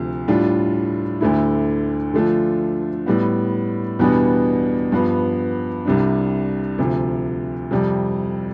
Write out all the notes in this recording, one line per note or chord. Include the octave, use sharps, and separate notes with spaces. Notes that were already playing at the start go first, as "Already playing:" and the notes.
Already playing: D2 C3 F3
A2 G3 D4 F4
D2 D3 A3 E4
D3 F3 A3 D4 F4
A2 G3 B3
E2 B2 G3 B3 D4
G2 F3 B3
C2 C3 G3 D4
D2 C3 F3
F2 C3 G3